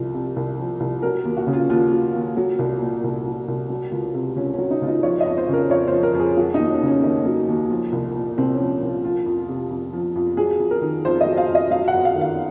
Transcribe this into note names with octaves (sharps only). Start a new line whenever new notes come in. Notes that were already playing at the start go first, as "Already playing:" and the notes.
Already playing: C2 F3
C3
C2
F3
C2
F#3 A#4
D#2
F#4
C#3
F4
D#2 F4
F#3
D#2
F#3
C2
A#2
C2
F#3
C2
F#3
C#2
C3
C#2 C#4
C#4
F#3
D#4
C#2 F4
D#4
F3 C#5
D#5
F2
C5
C#3 A#4
F2 C#5
F3 C5
A#4
F2
G#4
F#3 F#4
D#2 D#4
C#4
C#3
C#4
D#2 D#4
F#3
D#2
F3
C2
A#2
C2 C4
F3 C#4
C2 F4
F3 F4
F2
C3
F2
F3
F2
F#3 G#4
F2
A#4
D#3
F2 C5
D#5
F#3
F5
F2
D#5
F#3 F5
F#5
F#2
F5
D#3
F5